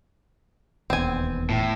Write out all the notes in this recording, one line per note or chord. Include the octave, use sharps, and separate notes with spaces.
E1 D#2 B3 C4 G#5
A2